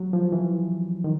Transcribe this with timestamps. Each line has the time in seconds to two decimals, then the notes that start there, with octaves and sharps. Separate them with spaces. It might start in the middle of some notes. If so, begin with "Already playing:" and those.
Already playing: F#3
0.13 F3
0.32 E3
1.04 D#3